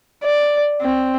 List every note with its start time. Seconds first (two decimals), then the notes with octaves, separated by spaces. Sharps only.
0.24 D5
0.82 C4